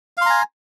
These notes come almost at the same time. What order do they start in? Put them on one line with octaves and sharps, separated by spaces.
F5 C6 A#5 G#5